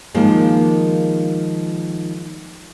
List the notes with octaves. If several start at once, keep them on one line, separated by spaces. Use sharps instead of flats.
D#3 F3 G#3 A#3